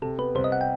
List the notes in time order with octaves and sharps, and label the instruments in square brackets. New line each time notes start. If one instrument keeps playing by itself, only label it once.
[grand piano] C3 [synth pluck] A4
[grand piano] B3 [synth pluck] B4
[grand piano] C2 [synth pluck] C5
[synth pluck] D#5
F#5
G5